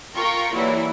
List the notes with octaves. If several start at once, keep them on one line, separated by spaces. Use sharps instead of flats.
F4 A#4 G5 A#5 C#6
E3 F#3 G3 A#3 E4